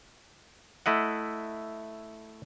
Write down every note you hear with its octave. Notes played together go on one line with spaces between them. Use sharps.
A3 E4 D#5 F#5